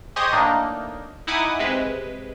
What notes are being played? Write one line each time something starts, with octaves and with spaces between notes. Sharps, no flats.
G4 G#4 C5 D#5 C#6 D#6
A2 A#3 D4 D#4
D#4 E4 F#5 G#5 D6 D#6
C3 G#3 B4